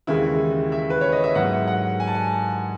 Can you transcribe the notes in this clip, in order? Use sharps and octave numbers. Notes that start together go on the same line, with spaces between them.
D#2 C#3 E3 G#3 E4
E5
B4
C#5
D#5
E5
G#2 F#3 B3 F#5
F#5
G#5
A5
G#5